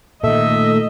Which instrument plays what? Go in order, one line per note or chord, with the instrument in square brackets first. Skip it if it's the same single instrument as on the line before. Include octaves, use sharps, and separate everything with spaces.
[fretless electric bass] A#2 D#3 [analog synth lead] A3 [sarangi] D#5 [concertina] E5